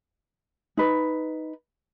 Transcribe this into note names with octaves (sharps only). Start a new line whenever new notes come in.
D#4 B4